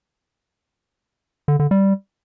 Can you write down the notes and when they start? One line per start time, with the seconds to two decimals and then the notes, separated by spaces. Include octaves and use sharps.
1.48 D3
1.60 D3
1.71 G3